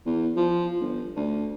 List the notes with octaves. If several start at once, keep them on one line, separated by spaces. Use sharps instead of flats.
E2
F3
G1
D2